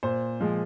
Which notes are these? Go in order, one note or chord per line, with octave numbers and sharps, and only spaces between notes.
A#2 C5
F3 G#3